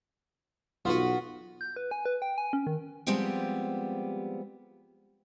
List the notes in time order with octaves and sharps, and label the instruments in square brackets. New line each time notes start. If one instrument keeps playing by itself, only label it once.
[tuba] B1 [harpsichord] B3 F#4 B4 [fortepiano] F4
[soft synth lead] G6
B4
G#5
B4
G5
G#5
C#4
D#3
[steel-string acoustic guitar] F3 G3 G#3 B3 C4 G4